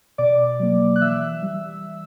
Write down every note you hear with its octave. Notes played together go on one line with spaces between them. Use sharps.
B2 D5 D6
F#3 A#3
F#6
E3 E5 E6
G3